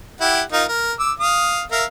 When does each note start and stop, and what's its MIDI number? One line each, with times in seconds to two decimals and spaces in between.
0.21 0.42 64
0.21 0.42 67
0.21 0.42 78
0.53 0.65 63
0.53 0.65 65
0.53 0.65 70
0.68 0.93 70
0.99 1.12 86
0.99 1.12 88
1.20 1.62 77
1.20 1.62 87
1.72 1.85 70
1.72 1.85 76
1.72 1.85 77